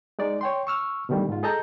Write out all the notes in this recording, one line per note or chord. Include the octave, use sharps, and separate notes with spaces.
G#3 D#4 D5
C#5 G5 C6
C#6 E6 F6
B2 D3 D#3 G3 A3
G#2 F4
G#4 A4 D#5 A5 A#5 G6